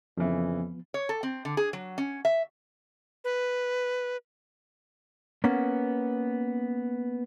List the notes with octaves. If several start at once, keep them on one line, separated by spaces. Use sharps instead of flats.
F2 C#3 E3 F3 B3
C#5
A4
C4
D3
G#4
F#3
C#4
E5
B4
A#3 B3 C#4